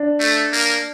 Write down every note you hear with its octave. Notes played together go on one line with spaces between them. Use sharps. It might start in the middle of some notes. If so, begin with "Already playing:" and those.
Already playing: D4
A3
A#3